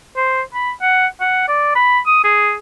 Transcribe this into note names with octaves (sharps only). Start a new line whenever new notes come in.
C5
B5
F#5
F#5
D5
B5
D#6
G#4